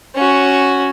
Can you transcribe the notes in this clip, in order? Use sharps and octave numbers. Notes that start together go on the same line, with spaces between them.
C#4 F#4